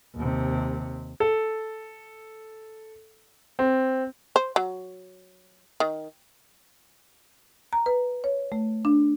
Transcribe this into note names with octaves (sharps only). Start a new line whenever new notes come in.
D#2 C3
A4
C4
C5
F#3
D#3
A#5
B4
C#5
A3
D4